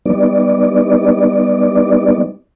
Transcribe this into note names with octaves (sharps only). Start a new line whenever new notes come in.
G3 B3 D#4 D5